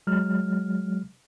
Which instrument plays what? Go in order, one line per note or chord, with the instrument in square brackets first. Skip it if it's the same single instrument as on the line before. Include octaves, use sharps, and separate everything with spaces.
[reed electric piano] F#3 G#3 F6